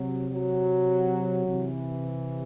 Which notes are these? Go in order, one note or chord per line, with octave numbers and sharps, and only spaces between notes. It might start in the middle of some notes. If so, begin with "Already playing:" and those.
Already playing: C3 F#3
F#3
C3 E3